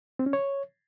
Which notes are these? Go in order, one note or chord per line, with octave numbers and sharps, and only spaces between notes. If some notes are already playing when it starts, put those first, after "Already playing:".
C4
C#4
C#5